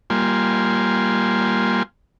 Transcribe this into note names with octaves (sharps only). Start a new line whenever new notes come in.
G3 A#3 F4 G#5 C6